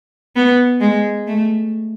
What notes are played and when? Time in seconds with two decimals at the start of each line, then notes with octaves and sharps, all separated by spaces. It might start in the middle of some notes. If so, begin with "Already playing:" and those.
0.36 B3
0.80 G#3
1.27 A3